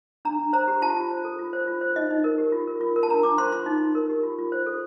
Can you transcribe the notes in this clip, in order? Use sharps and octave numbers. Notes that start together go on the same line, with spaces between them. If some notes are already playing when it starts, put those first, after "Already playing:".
D4 A#5
D4
C5 A#5
G4
F4 A5
F4
C5
A4
F4
C5
F4
C5
D#4 D#5
D#4
A#4
G4
F4
A#4
F4
A#4
A5
D4 A#5
D4 D6
C5 C6
F4 C6
D#4
D#4
A#4
G4
F4
F4
C5
A4